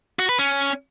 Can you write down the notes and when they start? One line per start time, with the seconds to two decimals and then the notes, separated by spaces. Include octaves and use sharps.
0.19 F#4
0.29 B4
0.39 C#4